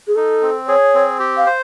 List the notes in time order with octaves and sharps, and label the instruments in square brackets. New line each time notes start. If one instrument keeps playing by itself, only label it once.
[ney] G#4
[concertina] D#4 [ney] A4
[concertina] C4
[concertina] G#4 [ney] C#5
[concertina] C4
G4
[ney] F5
[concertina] C5